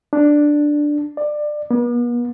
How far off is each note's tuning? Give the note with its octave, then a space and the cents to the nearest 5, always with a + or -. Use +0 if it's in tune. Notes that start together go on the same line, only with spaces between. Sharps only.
D4 +5
D5 +20
B3 -45